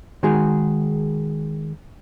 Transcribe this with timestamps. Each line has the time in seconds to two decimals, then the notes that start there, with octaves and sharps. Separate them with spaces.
0.23 D#3 G#3 F#4 G#4